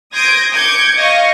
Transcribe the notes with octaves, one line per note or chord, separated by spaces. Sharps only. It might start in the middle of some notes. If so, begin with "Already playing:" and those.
C6 D#6 G6 G#6 A#6 D7
D6 G6 G#6 C#7
D#5 F5 C#6 A#6